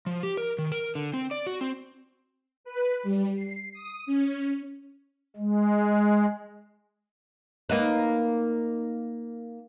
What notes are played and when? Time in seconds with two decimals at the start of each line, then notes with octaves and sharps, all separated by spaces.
0.06 F3
0.23 G4
0.37 A#4
0.59 D#3
0.72 A#4
0.95 D3
1.14 C4
1.31 D5
1.47 F#4
1.61 C4
2.64 B4
3.03 G3
3.36 C7
3.73 D#6
4.06 C#4
5.36 G#3
7.69 A#3 D#4 B4